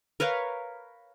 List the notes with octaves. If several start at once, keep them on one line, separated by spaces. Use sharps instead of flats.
A#4 B4 C#5 F5